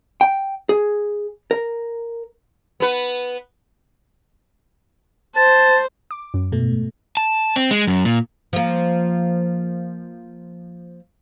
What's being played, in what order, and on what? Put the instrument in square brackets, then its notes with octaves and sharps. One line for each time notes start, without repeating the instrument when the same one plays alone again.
[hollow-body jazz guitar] G5
G#4
A#4
[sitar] B3 B4
[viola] C5 [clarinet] A5
[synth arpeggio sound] D6
F#2
[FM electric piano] G#2 B2 A3
[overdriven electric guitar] A5
C4
G#3
F#2
A#2
[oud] F3 A#3